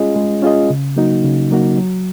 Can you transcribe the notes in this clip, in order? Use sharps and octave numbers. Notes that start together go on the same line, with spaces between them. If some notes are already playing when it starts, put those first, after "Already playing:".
Already playing: G#3 C#4 F4 G#4 D#5
G#3
C#4 F4 G#4 D#5
C#3
F#3 A#3 D#4 F#4
C#3
F#3 A#3 D#4 F#4
F#3